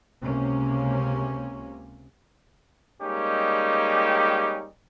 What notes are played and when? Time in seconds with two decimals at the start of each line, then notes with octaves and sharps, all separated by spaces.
0.23 C#2 C3 A#3 C#4
3.01 G3 G#3 A#3 C#4 D#4 G4